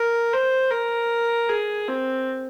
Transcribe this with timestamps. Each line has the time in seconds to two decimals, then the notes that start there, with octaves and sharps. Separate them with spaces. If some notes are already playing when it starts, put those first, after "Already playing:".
Already playing: A#4
0.33 C5
0.71 A#4
1.49 G#4
1.88 C4